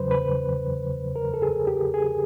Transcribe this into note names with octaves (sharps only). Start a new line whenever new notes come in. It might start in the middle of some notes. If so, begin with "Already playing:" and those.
Already playing: E2 C#3 F#3 B4 C5
B4
A#4
A4
G#4
G4
G#4